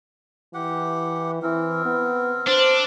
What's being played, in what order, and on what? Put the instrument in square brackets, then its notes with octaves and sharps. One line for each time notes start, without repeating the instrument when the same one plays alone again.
[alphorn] E3 [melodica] G4 F#5
[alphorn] E3 [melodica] C4 A#4
[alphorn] B3
[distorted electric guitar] D4 [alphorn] C5